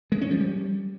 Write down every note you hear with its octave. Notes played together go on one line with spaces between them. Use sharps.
G#3
C#4
F3
G3